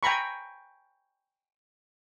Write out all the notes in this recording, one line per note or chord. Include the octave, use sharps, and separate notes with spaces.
G5 G#5 A#5 B5 C#6